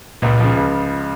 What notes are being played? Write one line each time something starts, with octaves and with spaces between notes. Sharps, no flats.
C#2 A#2
C#3 F3
C#2